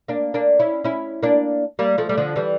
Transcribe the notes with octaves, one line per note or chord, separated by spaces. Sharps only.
A#3 D4
A#3 D4
C#4 E4
C#4 E4
A#3 D4
G3 A#3
F3 A3
G3
D3 F3
E3 G3